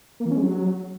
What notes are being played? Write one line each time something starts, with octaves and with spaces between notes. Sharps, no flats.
A#3
E3
C#4
G#3
F#3